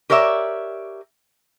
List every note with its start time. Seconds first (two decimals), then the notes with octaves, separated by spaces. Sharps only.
0.10 G4 A#4 C#5 D5 E5